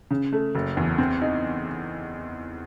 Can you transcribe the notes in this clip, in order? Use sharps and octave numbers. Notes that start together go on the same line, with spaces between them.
C#3
A3
F#1
E2
C4
D#4